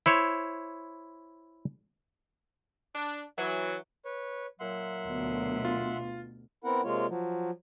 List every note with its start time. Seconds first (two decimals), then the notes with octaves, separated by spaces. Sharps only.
0.06 E4 C5 C#5
2.95 D4
3.38 E3 F#3
4.05 B4 C#5
4.60 A#2 F#3 E5 F#5 C6
5.05 D2 B2
5.65 F4
6.64 B3 C4 E4 A#4 F#5
6.84 C3 G#3 A#3 F4 C#5
7.08 F3 F#3